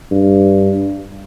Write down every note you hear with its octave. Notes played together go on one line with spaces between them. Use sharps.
G2